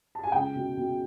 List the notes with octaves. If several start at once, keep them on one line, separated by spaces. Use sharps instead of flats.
A5
G#5
C#2 G5
B2
B2